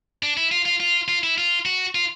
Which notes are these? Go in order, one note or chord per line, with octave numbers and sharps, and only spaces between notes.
D4
E4
F4
F4
F4
F4
E4
F4
F#4
F4